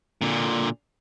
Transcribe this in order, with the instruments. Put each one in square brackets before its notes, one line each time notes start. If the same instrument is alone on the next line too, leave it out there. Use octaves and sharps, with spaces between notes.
[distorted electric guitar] A#2 D3